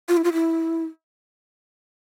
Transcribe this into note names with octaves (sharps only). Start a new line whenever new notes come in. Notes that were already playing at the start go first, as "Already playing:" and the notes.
F4
E4
F4
E4